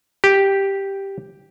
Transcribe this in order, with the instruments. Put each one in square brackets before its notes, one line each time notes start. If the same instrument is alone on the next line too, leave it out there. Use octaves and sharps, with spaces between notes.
[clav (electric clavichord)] G4